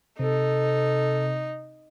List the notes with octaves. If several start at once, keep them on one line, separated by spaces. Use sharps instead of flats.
C3 D#4 A4